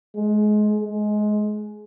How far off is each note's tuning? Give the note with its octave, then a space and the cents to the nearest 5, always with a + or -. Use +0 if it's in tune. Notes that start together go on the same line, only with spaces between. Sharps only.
G#3 +25
G#3 +20